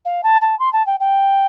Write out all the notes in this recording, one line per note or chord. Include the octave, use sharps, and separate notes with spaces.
F5
A5
A5
C6
A5
G5
G5